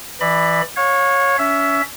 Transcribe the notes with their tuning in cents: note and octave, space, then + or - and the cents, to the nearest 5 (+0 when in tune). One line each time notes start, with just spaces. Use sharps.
E3 +5 D5 +30 B5 +0
C#5 -10 F5 +35
C#4 +30 E5 +5